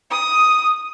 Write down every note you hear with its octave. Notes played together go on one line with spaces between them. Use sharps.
D#6